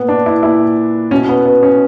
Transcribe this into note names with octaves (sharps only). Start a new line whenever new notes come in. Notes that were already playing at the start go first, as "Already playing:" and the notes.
Already playing: A#2 B3
D4
E4
A#2 E4
B2 C#4
B3
B3
C#4